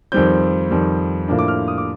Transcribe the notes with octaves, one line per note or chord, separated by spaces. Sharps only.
F2 D#3 G3 C4 G6
F2 D#3 G3
A2 F3 A#3 D4
D6
F6
D#6
D6